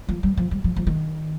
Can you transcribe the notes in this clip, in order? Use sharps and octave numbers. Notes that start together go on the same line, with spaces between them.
F3
G3
F3
G3
F3
F3
D#3